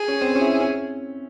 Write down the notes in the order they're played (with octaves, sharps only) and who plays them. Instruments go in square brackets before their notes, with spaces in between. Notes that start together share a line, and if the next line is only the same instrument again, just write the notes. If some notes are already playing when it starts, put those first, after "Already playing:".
Already playing: [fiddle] G#4
[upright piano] C#4
C4
C#4
E4
C#4